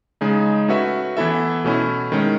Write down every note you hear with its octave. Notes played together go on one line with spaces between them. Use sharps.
C#3 G#3 D#4 G#4
A3 C#4 F#4 B4 E5
E3 B3 E4 A4 E5
B2 A3 C#4 E4
D#3 G#3 C#4